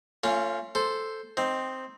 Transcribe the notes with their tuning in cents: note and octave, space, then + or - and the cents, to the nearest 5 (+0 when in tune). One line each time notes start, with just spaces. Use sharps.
A3 +40 C#4 +5 F4 +0
A4 +0 C5 +0
C4 +0 D#4 +0